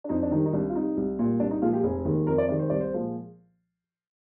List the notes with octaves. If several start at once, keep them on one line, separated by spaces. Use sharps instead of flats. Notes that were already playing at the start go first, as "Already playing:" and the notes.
D4
F2 D#4
D4
D#3 G3 D#4
D#4
C2 D4
F4
C3 G3 D#4
C2
A#2 G3
C2 D4
D#4
A#2 F3 G#3 F4
G4
F1 G#4
D#2 D#3 G#3
F2 A#4
D5
C3 D#3 G#3 D5
C5
C2 D5
C5
A#2 F3 G#3